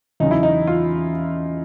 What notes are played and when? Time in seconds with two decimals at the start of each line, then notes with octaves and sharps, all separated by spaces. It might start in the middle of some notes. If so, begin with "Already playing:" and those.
0.20 E2 C#3 F#3 D#4
0.31 E4
0.43 D#4
0.67 F4